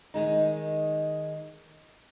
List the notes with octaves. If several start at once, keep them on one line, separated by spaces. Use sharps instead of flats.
D#3 G#3 D#4